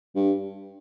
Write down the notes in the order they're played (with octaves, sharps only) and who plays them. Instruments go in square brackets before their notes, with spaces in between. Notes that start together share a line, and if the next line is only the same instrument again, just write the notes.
[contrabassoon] G2